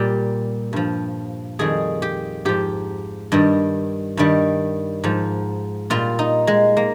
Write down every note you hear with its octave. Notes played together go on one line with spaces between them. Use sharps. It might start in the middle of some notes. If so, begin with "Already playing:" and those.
Already playing: A#2 G3 G4
G2 F3
F2 D#3 G3 G#4
G4
G#2 F3 G4
G2 D#3 G3
G2 D#3 G3
G#2 F3
A#2 G3 F4
D#4
G#3
A#3